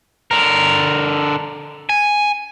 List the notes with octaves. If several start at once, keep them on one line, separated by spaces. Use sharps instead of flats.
D3 A#4
G#5